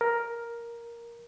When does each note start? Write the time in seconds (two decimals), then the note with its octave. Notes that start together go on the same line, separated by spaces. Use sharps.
0.01 A#4